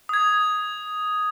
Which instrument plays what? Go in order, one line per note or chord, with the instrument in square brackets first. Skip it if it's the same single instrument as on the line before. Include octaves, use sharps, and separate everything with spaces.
[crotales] D#6 G#6